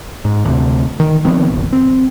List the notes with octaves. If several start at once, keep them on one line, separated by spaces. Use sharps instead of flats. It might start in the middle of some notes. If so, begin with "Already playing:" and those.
G#2
D2 C3
D#3
D#3 F3 B3 C4
F1 A#1
C4